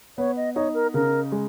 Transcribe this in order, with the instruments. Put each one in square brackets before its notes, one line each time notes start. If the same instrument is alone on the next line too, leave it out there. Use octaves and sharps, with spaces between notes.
[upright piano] B3 [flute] C#5
[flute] D#5
[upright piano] D#4 [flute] C#5
[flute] A#4
[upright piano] C#3 [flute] A#4
[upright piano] G#3